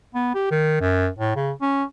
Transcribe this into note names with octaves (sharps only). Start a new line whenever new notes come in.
B3
G4
D#3
F#2
A2
C#3
C#4